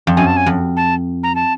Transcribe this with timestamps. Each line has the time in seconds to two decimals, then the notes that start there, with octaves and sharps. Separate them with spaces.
0.07 F2
0.17 F#2 G#5
0.27 A5
0.37 G#5
0.46 F2
0.77 A5
1.23 A#5
1.35 A5